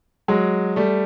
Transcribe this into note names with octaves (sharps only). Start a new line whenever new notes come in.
F#3 G#3
G3 A3